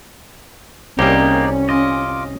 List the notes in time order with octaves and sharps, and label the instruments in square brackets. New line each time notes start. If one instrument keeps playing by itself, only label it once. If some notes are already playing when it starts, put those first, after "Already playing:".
[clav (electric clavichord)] C2 G3 [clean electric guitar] A#3 G4 [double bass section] C#4 [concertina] D#4 G#4 D5
[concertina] F4 D6 [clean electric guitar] D#5